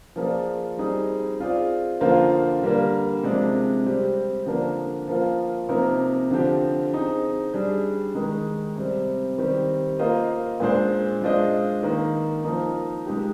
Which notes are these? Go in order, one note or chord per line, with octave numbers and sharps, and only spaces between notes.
F3 A#3 F4 G#4 D5
G3 C4 D#4 G#4
C4 F4 G#4 D5
D3 F3 A#3 F4 C5
D3 G3 A#3
C3 F3 G#3 D4
G3 C4 G4
D3 F3 A#3 D4
F3 A#3 F4
C3 F3 A#3 D#4 A#4
D3 F3 C4 G4
C4 D#4 G#4
G3 D4 G#4
D#3 G#3 D#4
C3 G3 C4
D#3 G3 C4 G4
A#3 F4 C5 D#5
A#2 G#3 D4 G#4 C5
G#3 D4 F4 C5 D#5
D#3 A#3 D#4
F3 A#3 D#4
G#3 D#4 G4